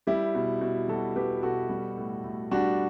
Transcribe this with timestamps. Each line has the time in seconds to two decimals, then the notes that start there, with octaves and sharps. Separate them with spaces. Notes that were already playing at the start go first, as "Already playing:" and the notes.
0.07 G3 E4 G4
0.35 B2
0.61 B2
0.88 G3 F#4 A4
1.16 G3 G4 B4
1.43 B2 F#4 A4
1.70 G3
1.97 A2
2.24 A2
2.51 G3 D4 F#4